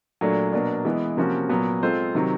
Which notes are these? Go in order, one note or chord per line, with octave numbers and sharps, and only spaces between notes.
A#2 F#3 A3 D4
B2 F#3 A#3 D4
E3 G#3 B3
C3 F3 A#3 C#4 F#4
A#2 F#3 B3
G#3 C4 F4 A4 C5
C3 D#3 F#3